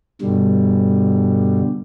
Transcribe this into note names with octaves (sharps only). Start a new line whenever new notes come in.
G2 B2 D3 G3